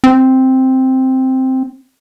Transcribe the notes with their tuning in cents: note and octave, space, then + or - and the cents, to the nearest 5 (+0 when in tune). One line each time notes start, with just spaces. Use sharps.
C4 +0